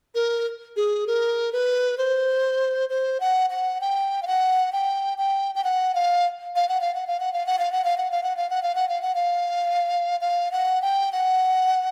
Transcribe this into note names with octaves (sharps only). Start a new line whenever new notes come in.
A#4
G#4
A#4
B4
C5
C5
F#5
F#5
G5
F5
F#5
G5
G5
G5
F#5
F5
F5
F#5
F5
F#5
F5
F#5
F5
F#5
F5
F#5
F5
F#5
F5
F#5
F5
F#5
F5
F#5
F5
F#5
F5
F5
F#5
G5
F#5